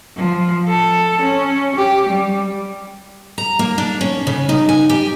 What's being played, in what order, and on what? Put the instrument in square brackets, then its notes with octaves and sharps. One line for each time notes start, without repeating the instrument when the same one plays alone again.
[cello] F3
A4
C#4
G4
G3
[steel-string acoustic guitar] A#5
A#3
D4
C#4
C#3
D#4
G#5
G4